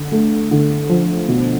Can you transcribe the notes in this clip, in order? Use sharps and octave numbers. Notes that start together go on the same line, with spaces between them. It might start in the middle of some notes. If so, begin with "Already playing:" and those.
Already playing: D3
A3
D3
F3
B2